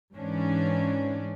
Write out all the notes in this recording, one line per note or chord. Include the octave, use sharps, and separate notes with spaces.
G#2 E3 C#4 D4